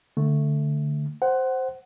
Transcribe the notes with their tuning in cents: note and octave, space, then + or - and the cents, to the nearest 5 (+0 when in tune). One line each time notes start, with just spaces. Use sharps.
D3 +0 A3 +5
C5 +0 F#5 +20